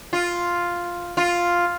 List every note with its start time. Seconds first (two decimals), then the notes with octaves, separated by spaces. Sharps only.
0.13 F4
1.17 F4